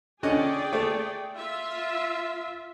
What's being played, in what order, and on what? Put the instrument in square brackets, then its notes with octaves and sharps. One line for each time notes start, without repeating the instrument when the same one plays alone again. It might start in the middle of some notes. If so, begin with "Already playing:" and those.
[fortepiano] D3 C#4 D#5 [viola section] G#4 D5 G5
[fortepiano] A3
[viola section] F4 E5